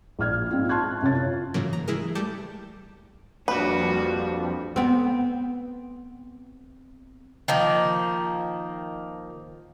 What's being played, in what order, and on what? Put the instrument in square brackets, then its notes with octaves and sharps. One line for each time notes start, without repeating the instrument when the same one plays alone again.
[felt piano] A#1 D5 F6 G#6
G#2 C4 F4
A5 C6 C#6 F#6 G#6
F#2 C3 C#5 A6
F4
[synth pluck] G#2 C#3 E3 F#3 A#3
A#5
E3 G#3 E4 G#4 A#4
G3 A3 A5 D6 G6 C#7
[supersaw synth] F2 F3 G3 [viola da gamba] A#3 D4 F#4 [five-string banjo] B4
[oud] B3 C4
[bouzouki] D#3 F3 A#3